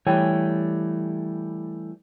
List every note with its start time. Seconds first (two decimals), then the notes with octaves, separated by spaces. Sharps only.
0.07 E3 G3 A3 C#5 G5 G#5